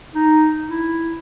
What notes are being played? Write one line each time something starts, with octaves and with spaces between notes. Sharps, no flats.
D#4
E4